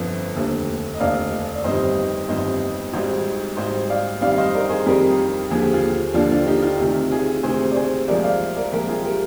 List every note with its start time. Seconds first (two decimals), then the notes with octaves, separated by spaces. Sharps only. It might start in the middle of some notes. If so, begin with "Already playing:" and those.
Already playing: G1 F2 D3 F3
0.35 F1 D#2 D3
0.94 D#5
1.00 F1 D#2 D3 D5 F5
1.55 D5
1.64 G1 F2 D#3 G3 C5 D#5
2.28 G1 F2 D#3 G3 C5 D#5
2.93 G#1 G#2 G3 C5 D#5
3.57 G#1 G#2 G3 C5 D#5
3.89 D5 F5
4.21 F2 D#3 G3 D5 F5
4.32 F5
4.37 C5 D#5
4.54 A#4 D5
4.70 G#4 C5
4.86 F2 D#3 G3 G4 A#4
5.50 D#2 D3 F3 G#4
5.62 G4
5.73 F4 G#4
6.14 D#2 D3 F3 D4 F4
6.31 D4 F4
6.47 D#4 G4
6.62 D4 F4
6.79 D2 C3 D#3
7.12 F4 G#4
7.43 D2 C3 D#3 G#4 C5
7.72 D5
7.76 G#4 C5
8.07 C2 A#2 F3 G#3 A#4 D5
8.23 D5 F5
8.57 A#4 D5
8.72 C2 A#2 F3 G#3 G4 A#4
8.88 F4 G#4
9.04 G4 A#4